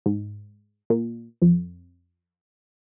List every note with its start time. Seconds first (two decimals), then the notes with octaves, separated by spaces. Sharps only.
0.06 G#2
0.90 A#2
1.42 F2